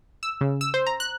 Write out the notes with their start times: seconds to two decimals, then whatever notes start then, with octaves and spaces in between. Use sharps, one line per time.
0.23 E6
0.41 C#3
0.61 E6
0.74 C5
0.87 A#5
1.00 F#6